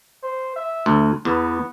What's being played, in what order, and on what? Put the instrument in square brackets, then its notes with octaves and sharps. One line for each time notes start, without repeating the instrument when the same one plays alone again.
[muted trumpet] C5
E5
[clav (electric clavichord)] D2
[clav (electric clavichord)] E2 [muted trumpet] B3